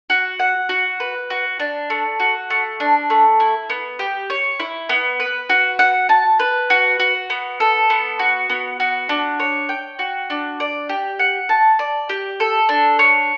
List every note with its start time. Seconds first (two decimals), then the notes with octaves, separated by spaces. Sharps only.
0.10 F#4
0.39 F#5
0.69 F#4
1.00 B4
1.30 F#4
1.60 D4
1.90 A3
2.20 F#4
2.50 A3
2.80 D4
3.10 A3
3.40 E4
3.70 B3
3.99 G4
4.30 C#5
4.60 E4
4.89 B3
5.20 B4
5.49 F#4
5.79 F#5
6.09 A5
6.40 B4
6.70 F#4
7.00 F#4
7.30 B3
7.60 A4
7.90 B3
8.19 F#4
8.49 B3
8.80 F#4
9.09 D4
9.40 C#5
9.69 G5
9.99 F#4
10.30 D4
10.60 D5
10.89 G4
11.19 F#5
11.49 A5
11.79 D5
12.09 G4
12.40 A4
12.69 D4
12.99 C#5